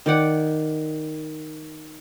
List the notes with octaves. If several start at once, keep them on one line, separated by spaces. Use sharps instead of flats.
D#3 D5 F#5 D6